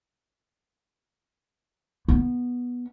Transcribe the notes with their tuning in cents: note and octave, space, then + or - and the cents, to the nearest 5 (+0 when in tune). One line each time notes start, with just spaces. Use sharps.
B3 -10